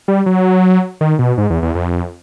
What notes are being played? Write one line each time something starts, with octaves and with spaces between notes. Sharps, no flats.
G3
F#3
D#3
B2
G#2
E2
E2
F2